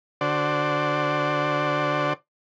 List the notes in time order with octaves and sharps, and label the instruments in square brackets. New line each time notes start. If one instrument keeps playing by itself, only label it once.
[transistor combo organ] D3 F#4 C5 D5